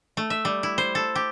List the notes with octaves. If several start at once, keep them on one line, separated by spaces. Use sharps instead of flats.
A3
E5
G3
E4
C5
A4
G4